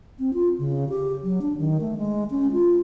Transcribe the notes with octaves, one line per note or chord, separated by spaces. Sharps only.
C4
F4
C#3
G4
F#3
D4
D#3
A3
G#3
C#4
F4